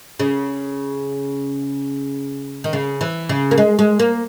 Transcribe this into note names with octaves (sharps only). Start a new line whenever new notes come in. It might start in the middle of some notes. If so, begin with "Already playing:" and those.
C#3
D#3
C#3
E3
C#3
A#3
G#3
G#3
A#3